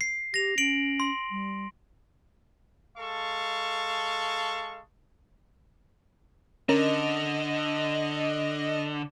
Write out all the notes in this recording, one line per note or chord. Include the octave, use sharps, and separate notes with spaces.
C7
G4 A#6 F7
C#4 D7 F#7
C6
G3
G#3 A4 F5 C#6
D3 C#4 A#4 D#5